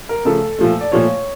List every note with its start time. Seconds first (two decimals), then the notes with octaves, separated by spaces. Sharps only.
0.09 A#4
0.25 C#3 F3 A3 A4
0.59 A#2 F3 A3
0.81 D5
0.92 A#2 F3 A3 C#5